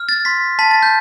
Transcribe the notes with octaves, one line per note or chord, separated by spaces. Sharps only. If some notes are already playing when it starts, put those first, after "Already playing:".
Already playing: F6
A6
C6 B6
A5 B6
A6
G6